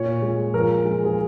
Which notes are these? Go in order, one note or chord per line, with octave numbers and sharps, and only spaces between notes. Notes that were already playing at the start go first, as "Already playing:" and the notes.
Already playing: A#2 C#5
G#3
F3 A#4
G#3
G#4